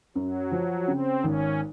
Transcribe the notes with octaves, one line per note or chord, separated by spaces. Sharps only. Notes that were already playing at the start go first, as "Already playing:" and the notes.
F#2 F#3
F3
C#3 C4
G#1 C#4